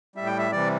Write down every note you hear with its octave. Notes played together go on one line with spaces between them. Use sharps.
A2 G3 E5
G5
E5
C3 E3 G3 D5